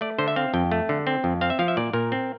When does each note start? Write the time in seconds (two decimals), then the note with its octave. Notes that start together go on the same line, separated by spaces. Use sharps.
0.01 A3 D5
0.18 D3 C5
0.28 E5
0.36 C4 F5
0.54 F2 G5
0.71 A3
0.89 D3
1.07 C4
1.24 F2
1.41 C4 F5
1.50 E5
1.59 F3 F5
1.68 E5
1.77 A#2 D5
1.93 A#2 A#4
2.12 C4